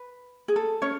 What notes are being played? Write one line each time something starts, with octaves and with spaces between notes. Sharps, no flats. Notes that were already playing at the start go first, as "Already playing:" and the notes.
Already playing: B4
G#4
A4
C#4 C#5